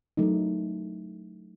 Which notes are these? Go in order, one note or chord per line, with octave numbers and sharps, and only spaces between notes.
F#3 A3 D#4